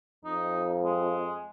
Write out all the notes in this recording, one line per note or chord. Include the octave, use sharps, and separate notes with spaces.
F2 D#4
G#3